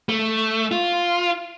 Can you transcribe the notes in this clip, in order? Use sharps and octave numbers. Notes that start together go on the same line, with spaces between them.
A3
F4